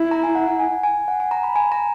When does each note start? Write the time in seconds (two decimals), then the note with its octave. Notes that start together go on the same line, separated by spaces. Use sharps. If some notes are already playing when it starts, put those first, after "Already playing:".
Already playing: E4
0.11 A#5
0.23 G#5
0.35 F#5
0.47 F#5
0.60 G#5
0.83 G#5
1.08 F#5
1.20 G#5
1.31 A#5
1.43 B5
1.56 G#5
1.72 A#5